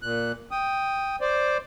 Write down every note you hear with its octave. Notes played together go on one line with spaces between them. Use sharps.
A#2 F#6
G5 D#6
C5 D5